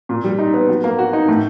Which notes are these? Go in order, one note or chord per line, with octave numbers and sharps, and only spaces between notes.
A#2
G3
D#4
B3
F#3
A#3
F#4
D#4
A2